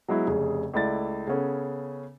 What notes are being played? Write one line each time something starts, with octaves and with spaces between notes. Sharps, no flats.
F#3 G#3 B3 E4
F1 C#3 G#4
C#2 A3 E4 D5 A6
C#3 B3 C#4 A4